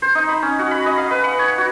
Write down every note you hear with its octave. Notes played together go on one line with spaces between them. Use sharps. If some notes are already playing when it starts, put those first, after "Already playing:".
C5
D#4
B5
C#4
F#4
B5
D#5
F5
B4
F#5
C#5
F#4